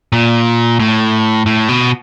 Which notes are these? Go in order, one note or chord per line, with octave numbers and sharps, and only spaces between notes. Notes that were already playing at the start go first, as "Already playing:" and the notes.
A#2
A2
A2
B2